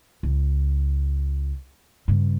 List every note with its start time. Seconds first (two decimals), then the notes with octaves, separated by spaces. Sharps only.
0.23 C#2
2.08 G2 C#3